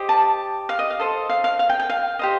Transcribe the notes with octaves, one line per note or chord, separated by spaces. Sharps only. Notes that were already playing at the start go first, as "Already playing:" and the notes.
Already playing: G4 C5 D#5
A5
F5
D#5
F5
A4 C5 D#5
F5
F5
F5
G5
G5
F5
G4 C5 D#5